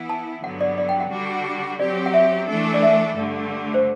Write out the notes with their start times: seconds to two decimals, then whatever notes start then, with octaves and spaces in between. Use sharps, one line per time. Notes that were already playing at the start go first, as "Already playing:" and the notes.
Already playing: E3 B3 E4
0.09 A5
0.43 G2 D3 F#3 B3 F#5
0.61 D5
0.78 D5
0.89 G5
1.00 F#5
1.11 D3 G3 D4 F#4
1.79 F#3 C4 G4 D5
2.06 F#5
2.14 E5
2.48 E3 A3 D4 A4
2.74 D5
2.82 E5
3.15 G2 D3 A3
3.74 C5